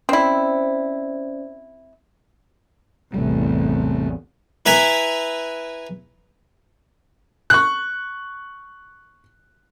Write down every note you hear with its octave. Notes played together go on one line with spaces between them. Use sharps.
C4 C#4 E4 C5 D5
A1 E2 C3 G3 A3
E4 B4 G#5 A#5
C#6 F#6